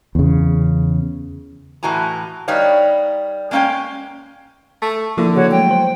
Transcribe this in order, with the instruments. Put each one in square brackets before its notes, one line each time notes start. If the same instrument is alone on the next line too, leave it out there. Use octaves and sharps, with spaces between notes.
[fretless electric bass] E2 C#3
[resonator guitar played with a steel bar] A2 E3 F#4 G#5 A#5
G3 D#4 B4 C#5 F5
G#3 A#3 C#4 E5 F5 G5
[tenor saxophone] A3 [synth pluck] A5
[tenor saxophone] D3 [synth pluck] F3 A#3 E4
[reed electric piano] C#3 G#4 E6 [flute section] F#4 C#5
[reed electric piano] F#3 G#3 A3 [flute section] G5
[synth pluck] C5